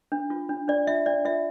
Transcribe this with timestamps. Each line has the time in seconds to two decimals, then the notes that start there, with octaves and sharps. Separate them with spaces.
0.12 D4
0.30 F4
0.49 D4
0.68 D4 D5
0.87 F4 E5
1.06 D4 D5
1.25 F4 E5